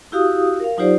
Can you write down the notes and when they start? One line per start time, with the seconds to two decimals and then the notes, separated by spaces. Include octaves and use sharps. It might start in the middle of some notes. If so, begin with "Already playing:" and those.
0.12 E4 F#4 G4 F5 D#6
0.60 A#4 F5
0.78 F#3 D#4 F4 G4 C5 D5